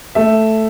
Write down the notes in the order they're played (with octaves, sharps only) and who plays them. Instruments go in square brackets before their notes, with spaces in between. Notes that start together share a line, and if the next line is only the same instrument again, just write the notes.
[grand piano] A3 E5